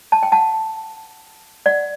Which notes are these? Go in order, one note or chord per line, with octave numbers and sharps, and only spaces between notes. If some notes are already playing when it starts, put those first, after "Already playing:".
A5
G5
F#5 A5
D5 F#5